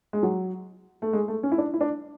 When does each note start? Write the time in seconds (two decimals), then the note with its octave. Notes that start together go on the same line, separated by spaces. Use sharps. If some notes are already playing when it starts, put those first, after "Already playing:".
0.13 G#3
0.23 F#3
1.02 A3
1.13 G#3
1.28 A3
1.43 C#4
1.52 E4
1.58 D4
1.74 E4
1.81 D4